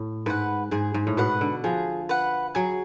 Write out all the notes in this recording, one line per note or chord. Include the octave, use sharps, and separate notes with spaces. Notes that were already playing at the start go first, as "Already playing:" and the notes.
Already playing: A2
G#2 B4 F#5
G#2 G#4
G#2
A2
B2 B4 F#5
D3
F3 G#4
B4 F#5
F#3 G#4